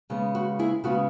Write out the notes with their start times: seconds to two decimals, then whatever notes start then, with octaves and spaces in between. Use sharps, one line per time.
0.10 C#3 G#3 B3
0.35 F#4
0.59 E4 G#4
0.84 C#3 G#3 B3 F#4